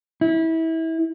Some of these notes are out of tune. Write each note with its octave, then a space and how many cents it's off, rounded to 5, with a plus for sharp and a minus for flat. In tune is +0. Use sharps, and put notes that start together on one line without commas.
E4 -25